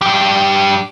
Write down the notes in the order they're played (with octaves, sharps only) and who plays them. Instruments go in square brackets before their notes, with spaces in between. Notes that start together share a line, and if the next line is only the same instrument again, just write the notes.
[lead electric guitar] G2 G4